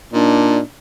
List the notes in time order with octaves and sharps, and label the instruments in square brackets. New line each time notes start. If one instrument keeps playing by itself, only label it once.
[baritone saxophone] A#2 [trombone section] D4 D#4